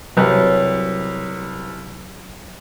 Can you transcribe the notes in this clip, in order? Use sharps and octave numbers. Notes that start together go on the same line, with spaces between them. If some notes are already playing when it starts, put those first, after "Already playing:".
C2 F#3 B4